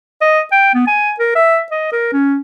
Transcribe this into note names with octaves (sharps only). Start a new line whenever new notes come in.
D#5
G5
B3
G#5
A#4
E5
D#5
A#4
C#4